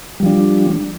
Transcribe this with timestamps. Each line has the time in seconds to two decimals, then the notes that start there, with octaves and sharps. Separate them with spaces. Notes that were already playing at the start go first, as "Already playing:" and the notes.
0.20 G3
0.23 F3
0.26 D4